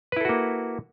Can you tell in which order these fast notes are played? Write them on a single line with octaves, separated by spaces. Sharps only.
B4 E4 A4 F#4 A#3